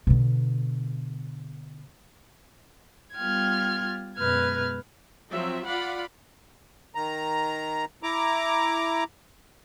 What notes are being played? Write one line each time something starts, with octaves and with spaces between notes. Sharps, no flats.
B2 D3
G3 B3 F4 G5 F6 G#6
F#2 B2 G#3 B4 F6 G#6
F3 F#3 C4 F4 E5
F4 D5 F5 F#5 B5
D#3 A#5
E4 A#5 D6